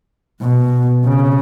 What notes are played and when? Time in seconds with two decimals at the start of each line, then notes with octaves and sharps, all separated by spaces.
0.41 B2
1.05 C#3